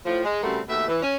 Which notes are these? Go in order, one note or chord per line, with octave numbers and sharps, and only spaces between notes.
A2 F3
G#3
C#3 G3 A3 C4 F#4 A#4
D#2 B2 A3 E5
E3
C#4